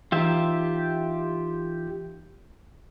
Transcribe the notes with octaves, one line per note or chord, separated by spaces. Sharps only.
E3 D#4 F4 G4 E5